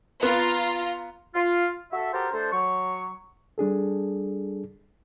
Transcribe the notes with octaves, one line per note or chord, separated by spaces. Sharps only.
B3 F4 A#5
F4
F#4 A4 E5
F#4 G4 A4 A#4 C5
A3 D4 A4 C5
F#3 C#6
G3 D4 G#4 A4